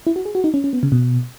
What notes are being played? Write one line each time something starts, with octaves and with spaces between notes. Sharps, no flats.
E4
F#4
G#4
F#4
D#4
C#4
C#4
B3
C#3
B2